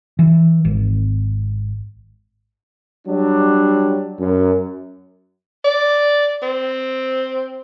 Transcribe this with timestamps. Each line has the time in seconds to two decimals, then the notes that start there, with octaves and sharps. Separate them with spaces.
0.19 E3
0.65 G#1
3.07 F#3 G3 D4
4.20 F#2
5.64 D5
6.42 C4